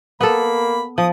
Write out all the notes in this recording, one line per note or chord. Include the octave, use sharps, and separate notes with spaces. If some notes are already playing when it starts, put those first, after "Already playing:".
A#3 B3 A4 B5
F3 D#6